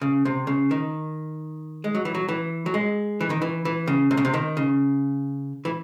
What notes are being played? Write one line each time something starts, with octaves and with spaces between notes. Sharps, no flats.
C#3
C3
C#3
D#3
G#3
F#3
E3
F#3
E3
F#3
G#3
E3
D#3
E3
E3
C#3
C3
C#3
C3
D#3
C#3
E3